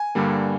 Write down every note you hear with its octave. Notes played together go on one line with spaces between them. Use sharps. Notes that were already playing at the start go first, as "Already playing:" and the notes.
Already playing: G#5
G2 D3 G3 A#3